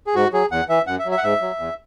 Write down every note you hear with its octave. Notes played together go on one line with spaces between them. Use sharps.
G#4
G#2 F#4
F#3 G#4
E2 F#5
E3 E5
F#2 F#5
E5
F#3
E5
F#5
G#2 E5
F#3
E2